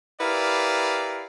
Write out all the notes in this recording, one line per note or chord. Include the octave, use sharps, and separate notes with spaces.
E4 G4 A#4 B4 D5 F5